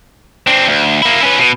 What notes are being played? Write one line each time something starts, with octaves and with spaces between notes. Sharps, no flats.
C4 D4
D2
A#3 E4
C#4 B4
B2